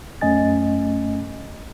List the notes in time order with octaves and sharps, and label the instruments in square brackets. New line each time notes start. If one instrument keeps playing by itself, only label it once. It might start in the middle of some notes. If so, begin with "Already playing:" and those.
[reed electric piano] F#2 A3 C#4 D#5 G#5 A6